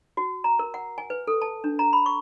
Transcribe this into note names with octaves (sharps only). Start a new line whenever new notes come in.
F#4
A#5
A#4
F#5
G#5
B4
A4
A5
D4
A#5
B5
C#6